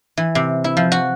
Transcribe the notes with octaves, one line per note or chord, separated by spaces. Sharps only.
E3
C3
E4
F3
F#4